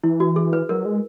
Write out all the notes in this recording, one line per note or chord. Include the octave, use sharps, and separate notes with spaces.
E3 E4
F#4
G#4
B4
F#3 A#4
G#3